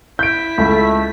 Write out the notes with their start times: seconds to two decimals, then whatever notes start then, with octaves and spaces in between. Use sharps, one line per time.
0.19 E4 G6 B6 D7
0.58 C#2 A3